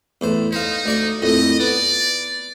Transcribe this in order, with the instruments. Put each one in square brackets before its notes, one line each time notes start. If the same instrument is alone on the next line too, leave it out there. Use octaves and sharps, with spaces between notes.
[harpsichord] E2 A2 C5
[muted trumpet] D#4 [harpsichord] C5 F5
[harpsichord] D2 D5 C#6
[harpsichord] A#1 F2 A2 [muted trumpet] D#5
[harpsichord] B3 [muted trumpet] D5